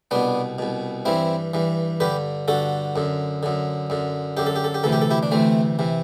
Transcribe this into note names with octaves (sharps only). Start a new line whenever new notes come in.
C2 B2 B3 D4
C2 B2
G2 E3 C4 E4
G2 E3
G2 D3 G4 B4
G2 D3 F#4 A4
F#2 D3
F#2 D3
F#2 D3
F#2 D3 G4
A4
G4
A4
G4
D2 C3 E3 A4
G4
A4
E4 G4
D4
D2 C3 E3 A3 C4
C3 E3